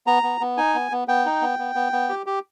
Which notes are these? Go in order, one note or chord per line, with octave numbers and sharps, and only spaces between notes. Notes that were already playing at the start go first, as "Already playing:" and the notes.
B3 A#5
B3
B3
D#4 G#5
B3
B3
B3 G5
D#4
B3
B3
B3
B3
G4
G4